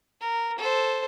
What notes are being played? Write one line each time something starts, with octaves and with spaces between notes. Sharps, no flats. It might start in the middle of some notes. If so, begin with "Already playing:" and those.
A#4
A4 C5